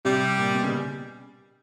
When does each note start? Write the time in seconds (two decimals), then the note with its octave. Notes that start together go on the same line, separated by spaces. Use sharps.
0.05 C3 G3
0.38 A#2
0.55 B2
0.63 C#3